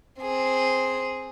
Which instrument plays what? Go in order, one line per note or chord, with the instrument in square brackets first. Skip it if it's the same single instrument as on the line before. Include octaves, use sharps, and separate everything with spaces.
[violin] C4 G#4